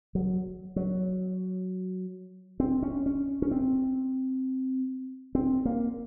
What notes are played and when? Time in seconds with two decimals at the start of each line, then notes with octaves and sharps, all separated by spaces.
0.15 F#3
0.76 F#3
2.60 C4
2.83 C#4
3.06 C#4
3.42 C#4
3.51 C4
5.35 C4
5.65 A#3